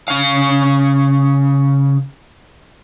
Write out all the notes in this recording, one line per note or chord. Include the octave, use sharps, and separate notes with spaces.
C#3 F5